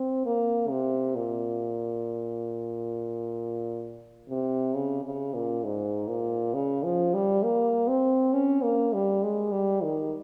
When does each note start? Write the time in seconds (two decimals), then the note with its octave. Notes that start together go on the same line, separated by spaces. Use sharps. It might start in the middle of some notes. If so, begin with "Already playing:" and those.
Already playing: C4
0.26 A#3
0.70 C3
1.15 A#2
4.29 C3
4.74 C#3
5.04 C#3
5.34 A#2
5.64 G#2
6.09 A#2
6.54 C#3
6.84 F3
7.14 G3
7.43 A#3
7.88 C4
8.33 C#4
8.63 A#3
8.93 G3
9.23 G#3
9.52 G3
9.83 D#3